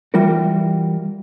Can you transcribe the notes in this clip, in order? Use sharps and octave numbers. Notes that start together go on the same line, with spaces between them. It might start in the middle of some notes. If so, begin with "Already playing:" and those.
E3 G3 F4 F#4 A#4